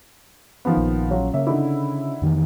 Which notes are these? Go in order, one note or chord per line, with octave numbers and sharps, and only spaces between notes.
D#3 F3 B3
A#1
F#3 C#4 F4
C#3 A#3 C#5 E5
D3 D#4 E4
F2 D#3 E3